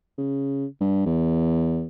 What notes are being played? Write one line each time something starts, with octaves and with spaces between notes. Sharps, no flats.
C#3
G2
E2